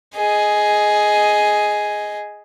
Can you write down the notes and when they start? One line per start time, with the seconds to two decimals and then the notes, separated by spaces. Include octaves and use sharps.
0.16 G#4 D#5